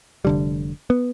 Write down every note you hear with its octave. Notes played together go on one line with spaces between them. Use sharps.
F1 D3 G3
B3